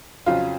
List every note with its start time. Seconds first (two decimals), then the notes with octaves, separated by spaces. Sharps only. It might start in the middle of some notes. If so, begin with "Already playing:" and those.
0.26 F2 C#3 F#3 F4